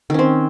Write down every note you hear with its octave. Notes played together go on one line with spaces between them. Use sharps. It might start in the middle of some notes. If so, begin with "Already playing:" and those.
D#3 C4 C#4